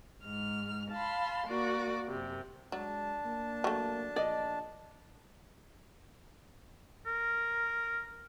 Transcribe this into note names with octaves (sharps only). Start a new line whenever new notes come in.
G#2 F6
F5 A5 B5 C6
A#3 F#4 D5
F#2 C3
F#3 G#3 D4 A5
A#3
F#3 A3
A#1 D5 D#5
A#4